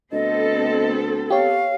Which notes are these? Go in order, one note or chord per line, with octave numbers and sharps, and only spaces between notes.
D2 B3 C4 A4 D#5
G4 C#5 F5